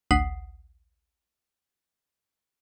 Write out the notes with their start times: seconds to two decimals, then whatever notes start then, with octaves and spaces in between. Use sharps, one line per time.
0.11 A1 D2 F#5 D#6 B6 C7